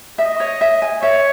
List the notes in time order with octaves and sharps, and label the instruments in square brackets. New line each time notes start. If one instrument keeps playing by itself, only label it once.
[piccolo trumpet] D#5 [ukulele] E5
[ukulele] C#5
E5
G#5
[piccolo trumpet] C#5 [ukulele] E5